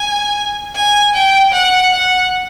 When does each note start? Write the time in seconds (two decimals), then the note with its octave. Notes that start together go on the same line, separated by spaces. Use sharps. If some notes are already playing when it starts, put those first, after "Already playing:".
Already playing: G#5
0.76 G#5
1.14 G5
1.53 F#5
1.92 F#5